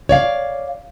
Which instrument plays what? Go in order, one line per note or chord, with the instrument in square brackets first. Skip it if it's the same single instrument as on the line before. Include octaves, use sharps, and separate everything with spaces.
[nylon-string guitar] C#5 D5 F5